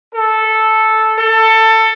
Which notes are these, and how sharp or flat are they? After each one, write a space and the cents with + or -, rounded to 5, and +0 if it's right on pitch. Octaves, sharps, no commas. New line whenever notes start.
A4 -5
A4 +20